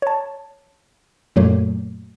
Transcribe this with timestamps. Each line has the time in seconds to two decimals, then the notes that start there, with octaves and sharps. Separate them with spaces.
0.02 C#5 A5
1.36 F#2 A#2 F#3 A3 A#3